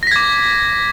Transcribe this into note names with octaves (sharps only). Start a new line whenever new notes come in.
D6 G#6 A#6 B6